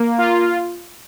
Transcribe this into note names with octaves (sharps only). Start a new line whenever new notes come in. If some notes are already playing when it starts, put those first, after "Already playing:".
Already playing: A#3
F4